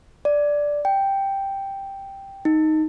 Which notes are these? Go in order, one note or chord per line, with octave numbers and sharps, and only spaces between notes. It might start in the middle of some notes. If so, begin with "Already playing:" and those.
D5
G5
D#4